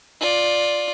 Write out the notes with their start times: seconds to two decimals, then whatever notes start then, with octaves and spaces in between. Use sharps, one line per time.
0.20 F4 D5